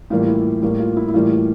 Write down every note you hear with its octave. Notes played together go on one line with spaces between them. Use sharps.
A2 E3 G3 A#3 F4
E4
A2 G3 A#3
F4
E4
E4
A2 E3 G3 A#3 F4
F4